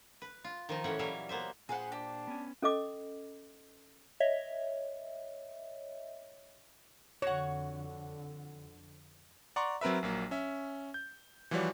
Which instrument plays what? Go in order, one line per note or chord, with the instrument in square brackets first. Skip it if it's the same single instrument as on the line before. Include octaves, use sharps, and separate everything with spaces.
[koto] B4
F4
D#3 F3 D#4
A2 C#3 E3 A3 C#4 F#5
A#2 E3 F#3 G3 E5 F5
A#3 B3 C5 E5
[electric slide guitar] A#2 C5 [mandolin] G#4 B4 F#5
[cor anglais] D4 [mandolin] G4
[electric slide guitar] B3 C#4
[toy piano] C#4 A4 D#5 D6
[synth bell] C#5 D#5 E5
[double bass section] F2 D3 [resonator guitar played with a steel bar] F#4 F#5 [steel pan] C#5
[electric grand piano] D5 F#5 A#5 C6 C#6
F#3 C4 A#4 B4 E5
A#1 F#3 A#3
C#4 E5
G6
E3 F3 G3 F#4 C#5 D5